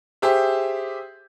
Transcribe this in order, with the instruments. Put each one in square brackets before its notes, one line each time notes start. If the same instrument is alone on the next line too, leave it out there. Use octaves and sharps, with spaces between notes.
[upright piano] G4 G#4 C5 E5